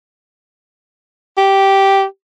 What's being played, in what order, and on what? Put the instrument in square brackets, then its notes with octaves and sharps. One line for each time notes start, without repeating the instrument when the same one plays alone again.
[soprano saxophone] G4